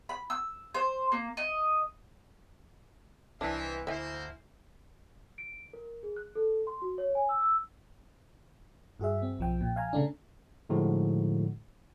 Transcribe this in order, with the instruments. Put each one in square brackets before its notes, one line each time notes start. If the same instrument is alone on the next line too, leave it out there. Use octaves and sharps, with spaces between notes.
[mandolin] B5
E6
C5
A#3
D#5
[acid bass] C2 [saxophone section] E3 [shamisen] D4 [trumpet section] C5 D#5 E5
[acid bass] D2 [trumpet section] A#3 C5 [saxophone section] E4 [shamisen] E5 G#5
[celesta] D7
A#4
G#4
F#6
A4
C6
F#4
C#5
G#5
E6
E6
[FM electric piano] G2 F#4 G#4 E5
C4
B1 F3 G5
A#2
F5 G#5 A#5
C#3 A3 D4
[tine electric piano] A2 D3 F3 G#3 D#4 F#4